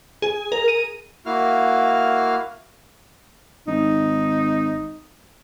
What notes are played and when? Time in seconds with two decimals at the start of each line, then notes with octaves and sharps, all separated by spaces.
0.22 G#4
0.52 A#4
0.68 D#7
1.26 A#3 E4 F#4 F5 F6
3.67 G#1 D#4